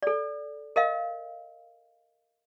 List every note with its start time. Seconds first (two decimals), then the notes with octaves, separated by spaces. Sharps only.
0.03 A4 D5
0.76 A#4 D#5 F5